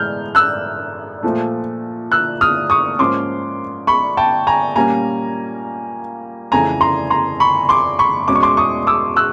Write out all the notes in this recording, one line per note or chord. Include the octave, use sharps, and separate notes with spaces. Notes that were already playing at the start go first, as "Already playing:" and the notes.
Already playing: A2 E3 G#3 B3 F6 G6
E6 F#6
A#2 F3 A3
E6 F#6
D#6 F6
C#6 D#6
G#2 F3 A#3 C#4 C6 D6
B5 C#6
G5 A5
G#5 A#5
A#2 G3 A#3 C#4 G#5 A#5
F2 C#3 E3 A3 G#5 A#5
A#5 C6
A#5 C6
B5 C#6
C6 D6
B5 C#6
E2 B2 G#3 C#4 D6
C#6
C6 D6
C#6 D#6
D6 E6
E6 F#6